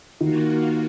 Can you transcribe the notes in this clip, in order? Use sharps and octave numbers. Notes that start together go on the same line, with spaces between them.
D#3 A#3 F4 F#4